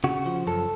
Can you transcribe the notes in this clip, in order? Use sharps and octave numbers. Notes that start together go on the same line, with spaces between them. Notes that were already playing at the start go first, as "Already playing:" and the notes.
C#3 F#4
F3
F#2 A4